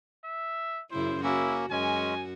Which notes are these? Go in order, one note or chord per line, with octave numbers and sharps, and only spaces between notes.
E5
F#2 C#3 E4 C5
A#3 C#4 E4 F#4
F#2 G#3 C#4 F#4 G#5